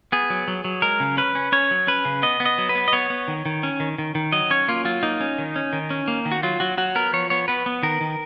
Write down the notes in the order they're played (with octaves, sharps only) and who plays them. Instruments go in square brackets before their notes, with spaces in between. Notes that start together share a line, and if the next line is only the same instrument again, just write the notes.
[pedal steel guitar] B3 G#4
F#3
F#3
F#3
G#3 A#4
C#3
C#4 B4
C#4
C#4 C#5
F#3
C#4 B4
C#3
B3 D#5
B3
D#5
F#3
B4
B3
D#5
B3 C#5
B3
D#3
D#3
C#4
D#3
D#3
D#3
F#3 D#5
C#4 C#5
A#3 F4
F#3 F4
A#3 D#4
C#4
D#3
C#4
D#3
C#4
A#3
D#3
F#4
F#3 F4
F#3 F#4
F#3 F#4
B3 A#4
F3 C#5
B3 C#5
B3 B4
B3
D#3 A#4
D#3